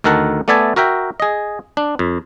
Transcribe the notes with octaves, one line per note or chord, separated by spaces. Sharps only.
D2 D#3 A4 A#4 F#5 A5
A3 B3 D5 E5 G#5 A5
F#4 A#4 E5 G5
G#4 D#5
D4
F2